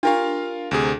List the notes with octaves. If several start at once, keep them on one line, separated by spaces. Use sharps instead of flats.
D4 F4 G4 A#4 F5
D2 C3 G#4